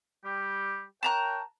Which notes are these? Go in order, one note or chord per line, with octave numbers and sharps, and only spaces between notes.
G3 G4
A#4 C#5 G5 A5 A#5 F#6